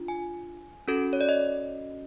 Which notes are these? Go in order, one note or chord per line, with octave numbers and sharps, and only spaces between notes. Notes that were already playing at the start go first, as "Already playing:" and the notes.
Already playing: D4 F4
G#5
C#4 F#4 A4
C#5
D5
D#5